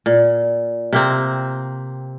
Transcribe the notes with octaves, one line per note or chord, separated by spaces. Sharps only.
A#2
C3 A#3 C4